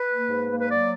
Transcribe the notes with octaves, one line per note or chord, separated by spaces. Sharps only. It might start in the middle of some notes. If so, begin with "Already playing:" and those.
Already playing: B4
A#3
G#2
A#3
B4
F#3 D5